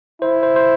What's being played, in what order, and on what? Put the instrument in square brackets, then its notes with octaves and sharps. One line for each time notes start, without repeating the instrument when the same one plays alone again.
[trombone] E4 [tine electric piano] C5
[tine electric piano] C5
C5